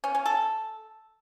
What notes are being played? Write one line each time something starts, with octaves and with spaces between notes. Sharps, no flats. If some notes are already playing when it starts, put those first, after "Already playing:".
C#4
C#4
A4